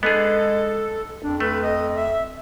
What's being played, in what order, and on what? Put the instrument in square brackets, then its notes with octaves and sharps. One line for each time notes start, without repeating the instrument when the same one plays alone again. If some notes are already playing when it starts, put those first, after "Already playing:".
[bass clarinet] G#3 [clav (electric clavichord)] B3 D4 G#4 [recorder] A4
[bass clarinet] F2 [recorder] D4
[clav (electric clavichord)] A3 [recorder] B4
[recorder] D#5
E5